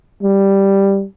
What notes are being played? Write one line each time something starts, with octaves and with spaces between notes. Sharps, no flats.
G3